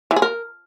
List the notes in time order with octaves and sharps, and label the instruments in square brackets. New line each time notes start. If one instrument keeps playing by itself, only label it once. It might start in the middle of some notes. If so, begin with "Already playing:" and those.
[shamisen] E3
G#4
A#4